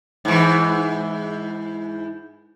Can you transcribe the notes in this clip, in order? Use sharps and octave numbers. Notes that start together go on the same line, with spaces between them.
G#2 E3